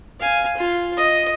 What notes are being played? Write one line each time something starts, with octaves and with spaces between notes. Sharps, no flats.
F5 G#5
F4
D#5